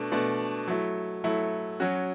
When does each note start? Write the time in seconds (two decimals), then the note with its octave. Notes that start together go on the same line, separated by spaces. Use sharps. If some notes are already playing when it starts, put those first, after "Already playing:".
Already playing: B2 A3 D4
0.12 B2 A3 D4
0.68 F#3 A3 E4
1.24 F#3 A3 E4
1.80 F#3 C#4 F#4